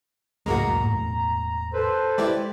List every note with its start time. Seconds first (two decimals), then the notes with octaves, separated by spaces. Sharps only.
0.46 C#2 F#2 A2 G#3 A#3 F#4 A#5
0.81 E1 A2
1.74 A4 B4 C5
2.18 G#3 E4 G4 D5